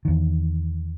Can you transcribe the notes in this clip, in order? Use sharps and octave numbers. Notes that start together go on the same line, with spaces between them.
E2 D#3